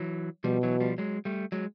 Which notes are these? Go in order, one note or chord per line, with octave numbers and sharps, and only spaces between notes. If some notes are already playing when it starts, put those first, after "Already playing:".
Already playing: E3 F#3
B2 F3 G3
E3 F#3
F3 G3
F#3 G#3
G3 A3
F#3 G#3